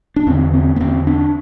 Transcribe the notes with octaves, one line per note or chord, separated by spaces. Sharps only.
D4
E2 D3 C4
C4
B3
E2 D3 C4
D4